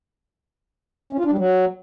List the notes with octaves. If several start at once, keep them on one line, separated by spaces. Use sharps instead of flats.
C#4
F4
D4
G3
F#3